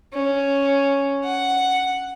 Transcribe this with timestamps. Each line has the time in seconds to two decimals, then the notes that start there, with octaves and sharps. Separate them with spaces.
0.13 C#4
1.24 F#5